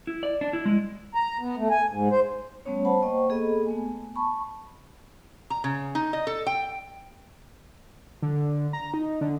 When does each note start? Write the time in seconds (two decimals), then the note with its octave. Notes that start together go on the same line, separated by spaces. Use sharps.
0.07 E4
0.23 D5
0.41 D4
0.53 E4
0.65 G#3
1.15 A#5
1.39 B3
1.57 A3
1.71 G#5
1.89 G#2
2.11 C5
2.65 G3 A3 B3 C#4 C#5
2.85 C5 F#5 A5 B5
3.02 A#3 C5 D#5 G5 C#6
3.29 A#3 B3 G#4 A4 D#5 B5
3.66 A3 B3 G#5
4.16 A5 B5 C#6
5.50 A#5
5.64 C#3
5.95 D#4
6.13 D#5
6.27 A4
6.47 G5
8.22 D3
8.73 A#5
8.94 D#4
9.21 D3